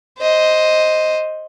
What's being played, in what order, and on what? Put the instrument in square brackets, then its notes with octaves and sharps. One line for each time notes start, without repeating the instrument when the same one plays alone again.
[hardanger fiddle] C5 D#5